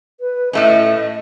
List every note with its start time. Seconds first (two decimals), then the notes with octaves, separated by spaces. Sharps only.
0.20 B4
0.53 A2 A3 C#4 D#5